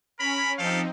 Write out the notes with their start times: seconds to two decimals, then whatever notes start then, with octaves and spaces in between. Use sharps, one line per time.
0.19 C#4 A#4 B5
0.58 F3 C4 D#4 G4 A4 F5